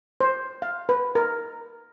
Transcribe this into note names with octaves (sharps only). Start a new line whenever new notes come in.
C5
F5
B4
A#4